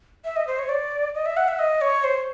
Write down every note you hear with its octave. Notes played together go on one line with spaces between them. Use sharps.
E5
D#5
C5
C#5
D5
D#5
E5
F#5
E5
D#5
C#5
C5